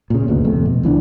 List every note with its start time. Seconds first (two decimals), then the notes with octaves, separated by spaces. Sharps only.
0.10 A#2 C#3
0.27 G1 D2 B2
0.44 F2 C3 A3
0.65 B2
0.83 C#2 E3 A3 D4